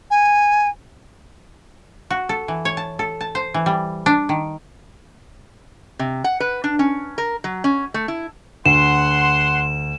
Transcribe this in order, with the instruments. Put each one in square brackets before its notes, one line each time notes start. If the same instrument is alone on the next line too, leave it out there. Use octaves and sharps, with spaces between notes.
[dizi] G#5
[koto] F#4
A4
E3
C#5
A5
A4
A5
C5
E3
G3
D4
D#3
[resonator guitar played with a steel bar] C3
F#5
B4
D4
C#4
A#4
F#3
C#4
A3
E4
[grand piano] D2 [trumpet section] F#5 C6 [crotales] E7